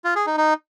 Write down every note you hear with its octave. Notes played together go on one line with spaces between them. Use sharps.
F4
G#4
D#4
D#4